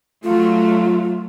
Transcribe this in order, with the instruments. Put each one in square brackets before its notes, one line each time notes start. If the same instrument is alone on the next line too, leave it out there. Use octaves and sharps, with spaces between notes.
[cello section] F#3 A3 [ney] F4